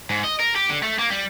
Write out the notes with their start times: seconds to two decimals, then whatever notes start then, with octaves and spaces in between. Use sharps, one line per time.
0.10 G#2
0.24 D#5
0.40 A#4
0.56 G4
0.69 D3
0.83 A3
0.99 A#3
1.10 G3